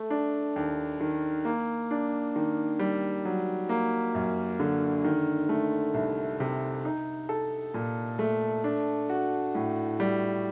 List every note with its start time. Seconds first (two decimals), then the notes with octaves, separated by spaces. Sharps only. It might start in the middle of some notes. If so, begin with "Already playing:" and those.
Already playing: A3
0.10 D4
0.56 D#2
1.01 D#3
1.45 A#3
1.91 D4
2.36 D#3
2.79 G3
3.25 F#3
3.69 A#3
4.15 F#2
4.60 D3
5.04 D#3
5.49 A3
5.94 C2
6.40 C3
6.85 D#4
7.29 A4
7.74 A#2
8.19 A3
8.64 D4
9.10 F#4
9.55 A2
10.00 G3